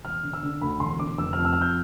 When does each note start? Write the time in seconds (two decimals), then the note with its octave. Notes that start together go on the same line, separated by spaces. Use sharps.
0.04 E1 F6
0.23 D3
0.33 E6
0.43 D3
0.61 D2 B5
0.80 E1 C6
0.99 D3 D6
1.18 F1 E6
1.33 F2 F6
1.45 E6
1.53 F6
1.57 F2 G6